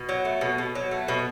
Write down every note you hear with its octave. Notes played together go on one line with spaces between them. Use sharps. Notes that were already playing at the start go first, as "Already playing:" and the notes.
Already playing: B2
F#3
A3
B2
B2
F#3
A3
B2